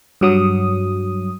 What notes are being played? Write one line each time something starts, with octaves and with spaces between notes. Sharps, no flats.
G2 F#3 D#6